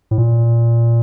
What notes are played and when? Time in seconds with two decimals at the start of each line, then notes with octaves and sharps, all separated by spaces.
0.11 A2
0.18 A#2